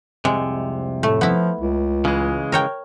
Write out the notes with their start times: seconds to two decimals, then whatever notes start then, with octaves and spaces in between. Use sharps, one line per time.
0.25 C2 F2 C3 G#3
1.03 A2 A3
1.21 F3 B3 E4
1.61 C#2
2.05 C#3 E3 G#3
2.52 A#4 C#5 G5